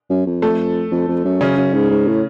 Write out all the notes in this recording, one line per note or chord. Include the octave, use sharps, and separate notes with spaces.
F#2
F2
A3 A4
F2
F2
F#2
F#2 C#3 C#4
F#2
G#2
G#2
A2